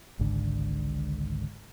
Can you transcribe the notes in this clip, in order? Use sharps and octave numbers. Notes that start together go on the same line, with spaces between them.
G#1 C#2 G#2 D3